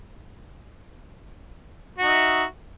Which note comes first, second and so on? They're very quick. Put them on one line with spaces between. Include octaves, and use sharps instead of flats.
F#4 D#4 E5